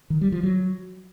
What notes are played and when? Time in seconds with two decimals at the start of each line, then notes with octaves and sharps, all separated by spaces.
0.10 D#3
0.21 G3
0.32 F3
0.43 F#3